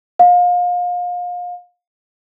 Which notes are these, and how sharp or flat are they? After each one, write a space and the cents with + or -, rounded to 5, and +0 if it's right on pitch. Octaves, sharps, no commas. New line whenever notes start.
F5 +30